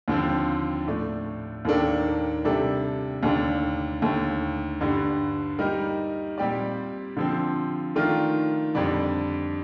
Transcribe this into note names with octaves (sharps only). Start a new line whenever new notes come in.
D#2 D3 F3 C4
A2 A3 D4
D#2 D#3 A#3 D4 A4
C3 G3 D4 A4
D#2 D3 A3 D4
D#2 D3 A3
G2 D3 G3
G3 A#3 D#4 A#4
A#2 G3 C4 G4 D5
D3 F3 C4
D#3 A3 D4 F4 A#4
F2 D3 G3 D4